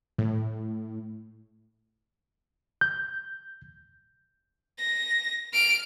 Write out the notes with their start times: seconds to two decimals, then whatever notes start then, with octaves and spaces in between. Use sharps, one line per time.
0.18 A2
2.81 G6
4.79 A#6
5.53 F6 D7